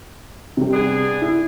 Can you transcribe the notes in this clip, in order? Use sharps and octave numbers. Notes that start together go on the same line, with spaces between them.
C3 G3
B3 D4 G#4
E4